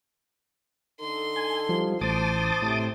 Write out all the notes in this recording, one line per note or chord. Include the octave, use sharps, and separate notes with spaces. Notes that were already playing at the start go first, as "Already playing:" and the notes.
D3 D#4 A4 C6
G#5
F3 G3
A1 C5 A5 D6 D#6
A2 C3